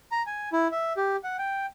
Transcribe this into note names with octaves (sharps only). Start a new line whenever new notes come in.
A#5
G#5
E4
E5
G4
F#5
G5